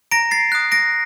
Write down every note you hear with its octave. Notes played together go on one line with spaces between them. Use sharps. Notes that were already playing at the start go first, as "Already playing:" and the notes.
A#5 A#6 D7
A6 C7
D#6 F#6
A#6 D7